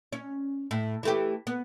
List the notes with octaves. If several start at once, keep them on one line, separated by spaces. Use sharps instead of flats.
C#4
A2
E3 A3 G4
B3